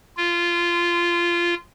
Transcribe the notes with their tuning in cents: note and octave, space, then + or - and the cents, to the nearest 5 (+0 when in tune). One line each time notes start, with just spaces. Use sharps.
F4 -15